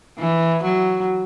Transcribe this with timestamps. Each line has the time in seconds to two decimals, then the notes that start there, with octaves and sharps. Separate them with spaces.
0.19 E3
0.64 F#3